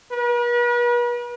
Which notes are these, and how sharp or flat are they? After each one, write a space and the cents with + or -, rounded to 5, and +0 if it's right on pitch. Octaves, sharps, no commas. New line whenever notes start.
B4 -45